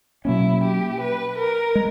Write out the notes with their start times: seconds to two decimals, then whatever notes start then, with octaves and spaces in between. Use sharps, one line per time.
0.25 B2 F#3 A#3 C#4 E4
0.63 G4
1.00 B4
1.39 A#4
1.75 G#3